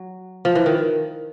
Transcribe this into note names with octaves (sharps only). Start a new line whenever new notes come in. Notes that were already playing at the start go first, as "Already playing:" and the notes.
Already playing: F#3
F3
E3
D#3